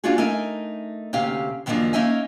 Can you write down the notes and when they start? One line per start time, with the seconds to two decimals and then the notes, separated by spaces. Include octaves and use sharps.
0.04 A#3 C#4 D4 F4 F#4 G#4
0.18 A3 D#4 A#4 G#5
1.13 D2 C3 A#3 C#4 G4 F5
1.66 F#2 D#3 F3 A3 A#3 D4
1.93 A#3 C#4 D#4 D#5 E5 G#5